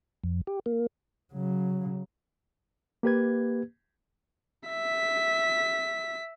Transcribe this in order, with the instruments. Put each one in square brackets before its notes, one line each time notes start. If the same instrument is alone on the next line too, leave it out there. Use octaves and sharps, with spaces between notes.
[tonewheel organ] F2
G4
A#3
[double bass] C#3 F#3
[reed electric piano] A#3 G4 B4 G#6
[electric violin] E5 B6